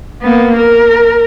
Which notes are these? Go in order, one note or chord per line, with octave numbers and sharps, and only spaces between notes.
A#3 B3
A#4